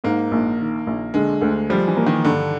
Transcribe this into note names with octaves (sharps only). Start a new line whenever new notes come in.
G#2 A#3
A#1
D#3
A#1
D3 G#3
D2
F3 G3
E3
A#3
D#3
G2 D3